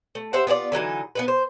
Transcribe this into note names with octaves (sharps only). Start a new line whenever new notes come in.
A3
G4 C5 E5 F#5
B3 F4 G4 D5
D3 E3 F#3 D#4
B3 D#4 B4
C5